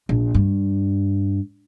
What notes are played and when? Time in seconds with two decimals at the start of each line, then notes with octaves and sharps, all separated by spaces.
0.09 A#1
0.34 G2